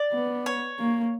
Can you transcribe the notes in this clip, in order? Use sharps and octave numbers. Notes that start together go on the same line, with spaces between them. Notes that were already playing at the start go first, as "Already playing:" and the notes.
Already playing: D5
B3
C#5
A#3